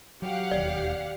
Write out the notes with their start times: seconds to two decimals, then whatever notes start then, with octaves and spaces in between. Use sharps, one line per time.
0.22 F#3 G4 F5 F#5
0.51 E1 D#2 D5